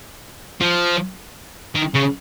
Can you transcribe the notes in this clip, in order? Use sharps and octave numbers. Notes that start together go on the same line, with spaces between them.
F3
D#3
C#3